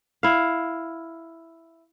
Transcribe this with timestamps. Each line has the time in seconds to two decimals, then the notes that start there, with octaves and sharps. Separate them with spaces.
0.23 E4 F5